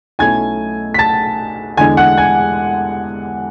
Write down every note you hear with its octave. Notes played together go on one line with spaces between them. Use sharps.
B1 B2 A3 C#4 E4 G#5 G#6
B6
A5 A6
E2 D3 G#3 D4 G#5 G#6
F#5 F#6
G#5 G#6